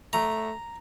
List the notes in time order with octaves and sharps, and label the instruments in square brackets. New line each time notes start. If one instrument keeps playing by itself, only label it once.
[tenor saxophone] A3 [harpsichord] A#5